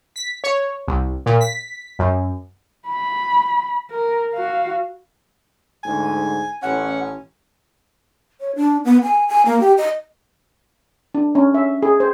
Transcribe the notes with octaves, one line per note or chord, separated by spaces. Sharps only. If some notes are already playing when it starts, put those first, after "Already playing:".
B6
C#5
C2
A#2
B6
F#2
B5
A#4
F#4 F5
D2 G#2 G#5
A1 C#4 F#5
C#5
D4
B3
G#5
G#5
A#3
G4
D#5
D4
C#4
E5
G#4
C5